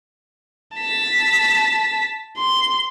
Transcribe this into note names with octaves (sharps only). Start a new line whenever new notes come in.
A5 B6
C6